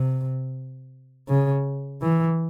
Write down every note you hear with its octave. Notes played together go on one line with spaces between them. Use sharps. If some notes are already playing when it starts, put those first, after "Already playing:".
Already playing: C3
C#3
E3